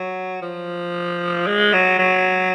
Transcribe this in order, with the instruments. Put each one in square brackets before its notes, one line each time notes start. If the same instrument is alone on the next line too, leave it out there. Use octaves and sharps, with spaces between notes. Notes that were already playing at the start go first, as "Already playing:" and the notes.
Already playing: [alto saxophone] F#3
F3
G#3
F#3
F#3